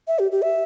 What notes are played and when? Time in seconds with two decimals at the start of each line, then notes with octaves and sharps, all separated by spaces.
0.08 E5
0.19 G4
0.32 G4
0.42 E5